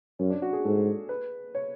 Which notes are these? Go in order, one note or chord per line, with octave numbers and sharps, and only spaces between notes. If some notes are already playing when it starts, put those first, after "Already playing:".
F#2 C#4
D4
F#4
G#4
G#2 A4
B4
C#5